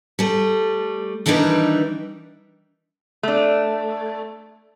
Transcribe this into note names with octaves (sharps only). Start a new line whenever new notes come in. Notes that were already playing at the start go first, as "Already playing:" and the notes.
G3 A3
D#3 E3 G3 D4 D#4 B4
A3 D4